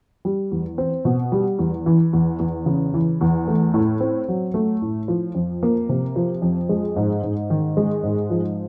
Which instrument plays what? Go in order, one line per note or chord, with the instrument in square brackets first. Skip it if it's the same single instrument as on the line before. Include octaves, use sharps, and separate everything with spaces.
[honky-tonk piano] G3
E2
C4
B2
G3
E2
E3
E2
E2
C#3
E3
E2
A3
A2
C4
F#3
A3
A2
F3
F2
A#3
C3
F3
F2
G#3
G#2
G#2
D#3
G#3
G#2
F3